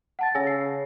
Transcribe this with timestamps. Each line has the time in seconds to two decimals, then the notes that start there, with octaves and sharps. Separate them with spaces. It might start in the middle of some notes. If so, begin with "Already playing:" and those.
0.19 F#5 A5 A6
0.35 C#3 G#5 E6 A#6
0.47 C7